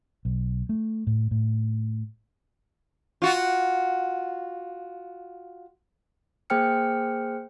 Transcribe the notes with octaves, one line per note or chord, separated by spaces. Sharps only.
B1
A3
A2
A2
F4 F#4
A#3 G#4 C5 G5 F6 C#7